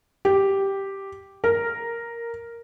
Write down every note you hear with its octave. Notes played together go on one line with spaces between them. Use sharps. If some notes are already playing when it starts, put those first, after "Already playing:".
G4
A#4